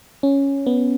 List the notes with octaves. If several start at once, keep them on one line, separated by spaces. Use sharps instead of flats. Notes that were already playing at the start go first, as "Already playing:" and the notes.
C#4
B3